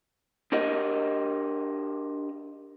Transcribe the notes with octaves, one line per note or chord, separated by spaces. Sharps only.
D4 G4 A#4 D#5 F#5